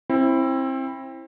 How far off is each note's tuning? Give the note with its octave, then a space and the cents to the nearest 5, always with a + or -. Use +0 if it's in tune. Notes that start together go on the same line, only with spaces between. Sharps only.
C4 +25 E4 +0